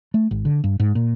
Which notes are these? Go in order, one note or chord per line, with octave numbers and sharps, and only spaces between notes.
A3
G#1
D3
G2
G#2
A#2